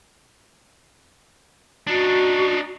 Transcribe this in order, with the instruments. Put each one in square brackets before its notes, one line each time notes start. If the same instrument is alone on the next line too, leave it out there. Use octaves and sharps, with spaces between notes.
[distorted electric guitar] D4 D#4 [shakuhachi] F#4